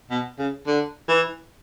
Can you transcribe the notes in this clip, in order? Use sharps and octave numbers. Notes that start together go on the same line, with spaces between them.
B2
C#3
D3
E3